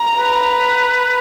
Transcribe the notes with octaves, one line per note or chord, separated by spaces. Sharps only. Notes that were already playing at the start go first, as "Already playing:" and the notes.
Already playing: A#5
B4